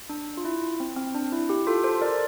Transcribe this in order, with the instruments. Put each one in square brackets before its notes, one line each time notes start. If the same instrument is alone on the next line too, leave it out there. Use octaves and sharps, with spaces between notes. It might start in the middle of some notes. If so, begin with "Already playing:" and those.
[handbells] D4
F4
E4
C4
C4
D4
E4
G4
F4 A4
A4 C5
A#4 D5